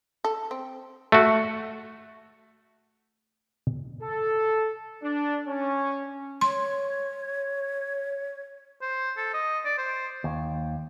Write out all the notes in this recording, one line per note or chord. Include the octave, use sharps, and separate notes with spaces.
A4
C4
A3 F#4
A4
D4
C#4
C#5 C6
C5
A4
D#5
D5
C5
D#2